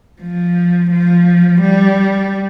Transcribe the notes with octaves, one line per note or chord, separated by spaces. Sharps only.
F3
F3
G3